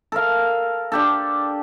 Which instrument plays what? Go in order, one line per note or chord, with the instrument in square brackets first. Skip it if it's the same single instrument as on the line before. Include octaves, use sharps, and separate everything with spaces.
[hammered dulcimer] A4 A#4 F5
D4 G4 A4